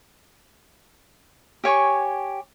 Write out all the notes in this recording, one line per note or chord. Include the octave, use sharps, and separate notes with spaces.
G4 C#5 G#5 C#6